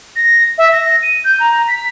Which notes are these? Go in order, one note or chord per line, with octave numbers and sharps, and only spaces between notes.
A#6
E5
A#6
D#7
G6
A#5
B6